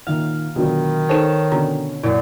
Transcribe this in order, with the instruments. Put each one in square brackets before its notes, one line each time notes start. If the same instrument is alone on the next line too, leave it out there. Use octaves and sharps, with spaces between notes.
[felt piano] A#2 D#3 [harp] F5
[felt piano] B2 D3 F#3 [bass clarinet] D#3 [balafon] F4
[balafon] D#4 A4 C5 [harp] C#5 [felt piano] A5 E7
[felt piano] B2 D3 C#4 [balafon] A#5
[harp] F#2 A#2 [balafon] E4